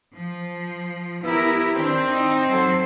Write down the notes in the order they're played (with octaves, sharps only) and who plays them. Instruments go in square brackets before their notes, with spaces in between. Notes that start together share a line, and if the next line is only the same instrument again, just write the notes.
[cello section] F3
[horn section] B3 B4 E5 [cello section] E4 G4 A#4
[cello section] D#3 D4 [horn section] C4
[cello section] D#4
F#3 A4 C5